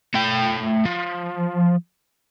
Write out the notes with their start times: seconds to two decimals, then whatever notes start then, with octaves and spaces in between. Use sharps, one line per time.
0.14 A3 G5
0.85 F3